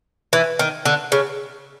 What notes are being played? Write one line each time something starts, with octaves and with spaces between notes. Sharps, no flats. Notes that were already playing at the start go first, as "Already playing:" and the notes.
E3
D#3
D3
C#3